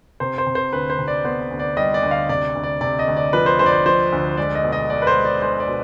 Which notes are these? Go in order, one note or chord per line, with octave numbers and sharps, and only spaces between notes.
C3 C5
C5
C3
C5
D2 B4
C5
C3
D5
B3 C5
D2
D5
G3 D#5
D5
D2
F5
C3 D5
D2
D5
C3 D5
D#5
D2
D5
F3 B4
C5
D2 C5
D5
C5
F3 C5
D2
G#3 D5
D#5
B2
D#5
B2 D5
B4
C5
G#3
D5
G#3 C5
D5
B2